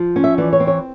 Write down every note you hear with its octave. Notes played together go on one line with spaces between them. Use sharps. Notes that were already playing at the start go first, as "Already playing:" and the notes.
Already playing: F3
C#4
E5
E3 D5
C#5
C4
C#5